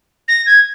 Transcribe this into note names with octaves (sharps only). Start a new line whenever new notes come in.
A#6
G#6